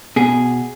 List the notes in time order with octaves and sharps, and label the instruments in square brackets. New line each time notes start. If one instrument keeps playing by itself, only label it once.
[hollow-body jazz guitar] B2 G#4